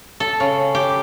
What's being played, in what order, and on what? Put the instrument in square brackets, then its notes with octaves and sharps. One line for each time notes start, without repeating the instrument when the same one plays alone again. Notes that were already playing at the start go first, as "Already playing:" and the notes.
[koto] A4
C#3
G4